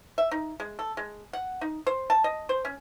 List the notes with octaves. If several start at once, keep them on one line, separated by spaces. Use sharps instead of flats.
E5
D#4
G#3
A4
G#3
F#5
D#4
C5
A5
D#5
C5
C#4